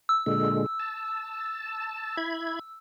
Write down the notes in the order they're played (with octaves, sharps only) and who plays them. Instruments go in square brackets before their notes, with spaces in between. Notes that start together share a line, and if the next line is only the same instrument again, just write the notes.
[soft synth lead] E6
[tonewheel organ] A#2 D3 G#3
A5
E4 B5 G#6